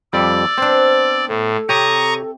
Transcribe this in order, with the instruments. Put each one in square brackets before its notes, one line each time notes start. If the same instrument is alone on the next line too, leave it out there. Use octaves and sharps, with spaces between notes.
[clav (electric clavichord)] F2 G3 [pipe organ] D5 [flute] E6
[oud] B3 C5 [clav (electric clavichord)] C4 D4
[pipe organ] A2 [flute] A4
[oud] C3 [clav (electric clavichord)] G4 C#5 [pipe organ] A#5 C#6 D#6